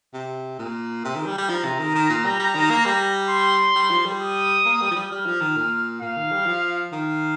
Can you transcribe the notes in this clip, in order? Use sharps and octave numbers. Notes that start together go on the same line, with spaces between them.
C3
A#2
C3
D#3
G3
G3
F3 A#5
C3
D#3
D#3
A#2
G3
G3
D#3
A#3
G3
C6
G3
F3
G3
D#6
A#3
G3
F3
G3
G3 F6
F3
D#3
A#2
A#2 F5
D#3
G3
F3
D#3 F5